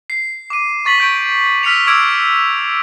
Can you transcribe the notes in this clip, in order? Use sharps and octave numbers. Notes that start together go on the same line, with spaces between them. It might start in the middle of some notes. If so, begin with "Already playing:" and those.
C7
D6 D#7
C#6 A6 B6 F#7
C#6 G6 D7
E6 F6 B6 C#7 F7
D6 E6 F6 G#6 D7